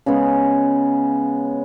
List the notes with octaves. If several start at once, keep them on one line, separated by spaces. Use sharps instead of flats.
C#3 G#3 B3